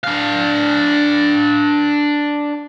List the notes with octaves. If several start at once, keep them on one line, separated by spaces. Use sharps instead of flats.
D4 F5